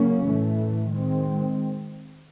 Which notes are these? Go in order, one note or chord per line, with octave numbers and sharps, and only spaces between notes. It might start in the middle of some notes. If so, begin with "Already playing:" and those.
Already playing: C#3 F#3 A#3 C#4
A2 E3 A3
D#3 G#3 C4